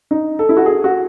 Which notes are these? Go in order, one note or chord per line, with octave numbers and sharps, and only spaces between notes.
D#4
A4
E4
F#4
G#4
F#4